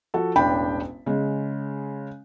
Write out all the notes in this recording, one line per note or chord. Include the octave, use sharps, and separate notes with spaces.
F3 F#4 A4
E1 A1 D4 G5 B5
C#3 G#3